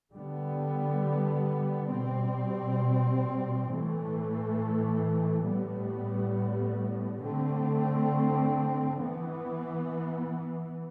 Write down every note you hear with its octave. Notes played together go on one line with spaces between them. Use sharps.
D3 G3 B3
B2 G3 C4
A2 E3 A3
A2 G3 B3
D3 A3 C4
E3 B3